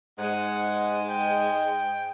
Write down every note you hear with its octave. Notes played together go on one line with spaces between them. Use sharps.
G#2 G#3 F#5
G5